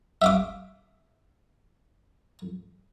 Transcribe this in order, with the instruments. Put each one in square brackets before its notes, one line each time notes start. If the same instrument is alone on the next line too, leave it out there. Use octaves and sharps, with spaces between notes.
[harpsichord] E5 F5 D6